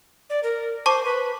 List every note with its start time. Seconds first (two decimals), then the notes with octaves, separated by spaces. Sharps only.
0.30 D5
0.43 A#4
0.86 C5 A5 C#6 D6
1.05 B4